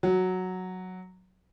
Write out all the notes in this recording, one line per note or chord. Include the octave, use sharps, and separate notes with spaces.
F#3